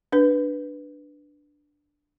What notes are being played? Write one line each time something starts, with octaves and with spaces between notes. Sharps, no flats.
D4 B4